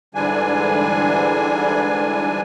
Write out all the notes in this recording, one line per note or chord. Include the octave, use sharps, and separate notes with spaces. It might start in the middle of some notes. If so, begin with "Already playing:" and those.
G#2 D3 E3 G3 D4 G#5